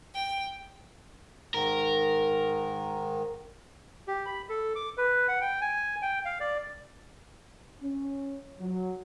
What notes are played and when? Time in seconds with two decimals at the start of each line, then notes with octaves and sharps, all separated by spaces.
0.14 G5
1.54 G#2 D#3 A#4
4.08 G4
4.26 B5
4.49 A4
4.76 D6
4.98 B4
5.28 F#5
5.41 G5
5.61 G#5
6.02 G5
6.25 F5
6.40 D5
7.82 C#4
8.60 F#3